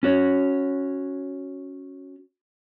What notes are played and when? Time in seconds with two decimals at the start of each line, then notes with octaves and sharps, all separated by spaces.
0.03 C#4 F#4 C#5